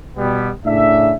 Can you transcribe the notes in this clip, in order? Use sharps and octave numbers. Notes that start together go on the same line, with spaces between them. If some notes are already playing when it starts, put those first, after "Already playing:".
B2 G3 B3
A2 C#3 D4 E5